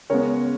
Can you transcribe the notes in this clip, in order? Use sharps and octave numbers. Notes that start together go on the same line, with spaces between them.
C#3 G#3 B3 A#4 C#5